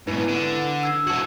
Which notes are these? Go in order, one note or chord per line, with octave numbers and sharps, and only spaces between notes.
G#2 B2 D4 E4 B4
D3
E6 G#6 C7
E3 F#4 A5 G#6